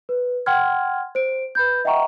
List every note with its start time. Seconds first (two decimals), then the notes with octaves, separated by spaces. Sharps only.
0.09 B4
0.46 F#5 G5 C6 F6 G#6
1.15 C5 D7
1.55 B4 B5 G6
1.85 D#5 E5 F#5 G5 A#5 C#6